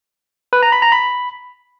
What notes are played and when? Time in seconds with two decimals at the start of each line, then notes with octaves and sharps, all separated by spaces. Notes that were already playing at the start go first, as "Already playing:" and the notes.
0.53 B4
0.63 A#5
0.72 B5
0.82 A#5
0.92 B5